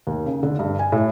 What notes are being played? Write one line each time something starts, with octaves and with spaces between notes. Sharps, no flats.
D#2
C#3
D3
G2
G#5
A2